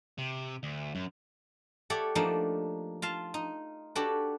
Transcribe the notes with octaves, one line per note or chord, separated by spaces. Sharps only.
C3
D2
F#2
G4 A4 C#5 D5 E5 F#5
F3 A3 A#3 D4 D#4
F4 F5 A5
D#4
D4 F#4 G4 A4 B4